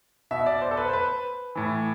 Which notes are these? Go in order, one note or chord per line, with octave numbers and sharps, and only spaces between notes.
B2 E5
D5
C5
A4
B4
C5
B4
A2 E3